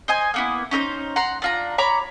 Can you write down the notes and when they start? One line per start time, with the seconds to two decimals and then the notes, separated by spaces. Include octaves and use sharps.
0.08 C5 D#5 G#5
0.34 A#3 B3 E4
0.71 C#4 D#4 A4 C5
1.16 F#5 A#5 C6
1.42 D4 F4 A#5
1.78 C#5 A#5 B5 D6